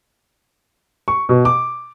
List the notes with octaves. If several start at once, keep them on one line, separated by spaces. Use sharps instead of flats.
C#6
B2
D6